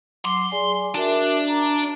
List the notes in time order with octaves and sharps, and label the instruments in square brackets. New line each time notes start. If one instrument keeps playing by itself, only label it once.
[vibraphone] F#3 D6 [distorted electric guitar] C6
[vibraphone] G#4 D5 G#5
[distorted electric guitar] D4 [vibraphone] F#4 A#4 E5
[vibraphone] A#5